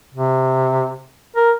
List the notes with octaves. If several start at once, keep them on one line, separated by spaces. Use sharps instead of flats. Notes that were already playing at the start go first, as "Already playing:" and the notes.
C3
A#4